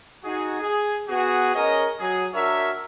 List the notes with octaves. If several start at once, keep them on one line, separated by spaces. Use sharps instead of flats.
D#4 F#4 G#4
G#4
B3 F#4 G#4
C#4 G#4 A#4 C#5 D#5
F#3 G#4
D4 F#4 A#4 C#5 E5